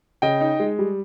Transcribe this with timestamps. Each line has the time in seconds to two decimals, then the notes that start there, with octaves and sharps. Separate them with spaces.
0.22 C#3 D#5 G5
0.41 D#4
0.60 G#3
0.79 G3